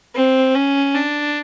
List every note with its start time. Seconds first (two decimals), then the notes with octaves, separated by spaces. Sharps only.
0.15 C4
0.55 C#4
0.95 D4